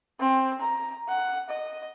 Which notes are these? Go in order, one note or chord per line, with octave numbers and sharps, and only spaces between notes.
C4
A#5
F#5
D#5